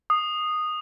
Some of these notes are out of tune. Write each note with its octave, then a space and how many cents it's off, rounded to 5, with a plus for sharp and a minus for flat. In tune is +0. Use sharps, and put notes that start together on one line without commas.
D#6 -10